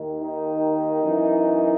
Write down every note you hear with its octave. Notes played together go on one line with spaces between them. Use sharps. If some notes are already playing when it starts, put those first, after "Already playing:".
Already playing: D#2 D#3
D#4
F#2 E3